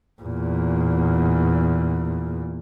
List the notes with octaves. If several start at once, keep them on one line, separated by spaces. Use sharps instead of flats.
E2 A#2